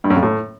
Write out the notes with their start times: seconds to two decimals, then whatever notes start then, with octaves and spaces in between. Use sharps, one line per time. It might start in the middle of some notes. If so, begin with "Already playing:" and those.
0.04 G2
0.10 F#2
0.16 F2
0.22 A2